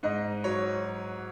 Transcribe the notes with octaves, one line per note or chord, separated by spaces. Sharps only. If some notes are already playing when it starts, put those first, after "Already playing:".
G#2 D#5
F#3 C#5